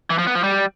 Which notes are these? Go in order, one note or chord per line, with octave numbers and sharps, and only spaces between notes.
E3
F3
B3
F3
G3